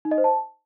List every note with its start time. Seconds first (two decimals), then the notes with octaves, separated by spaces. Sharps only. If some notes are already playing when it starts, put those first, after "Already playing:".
0.05 D#4
0.11 D#5
0.18 C5
0.24 A5